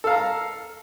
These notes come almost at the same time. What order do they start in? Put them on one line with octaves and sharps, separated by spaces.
A4 F5 A#5